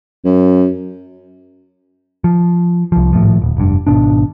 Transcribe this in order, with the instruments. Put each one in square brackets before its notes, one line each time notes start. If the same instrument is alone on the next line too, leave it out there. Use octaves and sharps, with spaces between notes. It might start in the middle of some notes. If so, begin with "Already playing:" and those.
[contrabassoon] F#2
[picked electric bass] F3
C2 F3
G#1 A2 F3
D#1
F1 G2
G#1 B2 D4